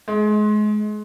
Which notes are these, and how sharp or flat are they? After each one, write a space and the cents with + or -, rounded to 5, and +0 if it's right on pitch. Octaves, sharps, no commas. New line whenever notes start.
G#3 +30